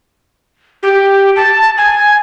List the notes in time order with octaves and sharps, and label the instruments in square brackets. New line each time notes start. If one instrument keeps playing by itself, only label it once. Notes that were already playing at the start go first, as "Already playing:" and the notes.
[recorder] G4
A5
G#5